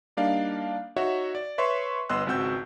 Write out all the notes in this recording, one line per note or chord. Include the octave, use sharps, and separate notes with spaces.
G3 A#3 D4 D#4 D5 F5
D#4 F#4 C#5 E5 F#5
D5
B4 C#5 E5 C6 C#6
G1 B3 D#5 C6 E6 F#6
G#1 C#2 C4 F#4 E6 G6